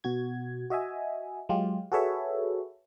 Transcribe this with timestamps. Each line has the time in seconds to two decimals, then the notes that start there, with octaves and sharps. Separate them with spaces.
0.04 B2 F#4 G#6
0.70 F#4 D#5 E5 G#5
1.49 F#3 G#3 F4 G4
1.92 F#4 G#4 A4 B4 C#5 E5